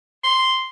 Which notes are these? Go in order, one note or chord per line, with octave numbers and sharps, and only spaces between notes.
C6